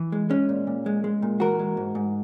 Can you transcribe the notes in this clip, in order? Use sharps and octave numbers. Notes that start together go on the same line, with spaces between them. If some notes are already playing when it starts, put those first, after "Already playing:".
Already playing: E3
G#3
G#3 C#4
A#2
A#2
G#3
G#3
A#2
E3 F#4 A#4
G#3
G#2
G#2